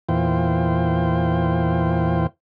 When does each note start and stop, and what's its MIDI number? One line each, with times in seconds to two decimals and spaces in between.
0.09 2.27 40
0.09 2.27 46
0.09 2.27 52
0.09 2.27 65
0.09 2.27 72
0.09 2.27 79